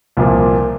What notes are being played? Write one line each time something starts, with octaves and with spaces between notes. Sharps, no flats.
C2 A#2 F3 A#3